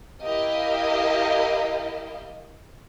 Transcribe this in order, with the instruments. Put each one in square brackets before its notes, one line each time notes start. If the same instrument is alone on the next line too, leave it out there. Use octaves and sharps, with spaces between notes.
[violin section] E4 G4 A#4 D#5 F5 G5